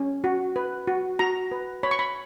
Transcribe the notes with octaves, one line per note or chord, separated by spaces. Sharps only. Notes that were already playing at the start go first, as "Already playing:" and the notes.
Already playing: C#4
F#4
B4
F#4
F#4 A#5
B4
C#5 B5
C#6
B5